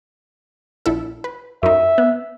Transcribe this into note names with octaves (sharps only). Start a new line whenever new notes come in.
A#1 E4 A4
B4
F#2 D#4 E5
B3